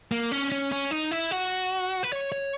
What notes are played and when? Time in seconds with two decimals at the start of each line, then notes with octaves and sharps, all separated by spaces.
0.12 A#3
0.32 C#4
0.52 C#4
0.72 C#4
0.91 D#4
1.11 E4
1.31 F#4
2.03 B4
2.12 C#5
2.32 C#5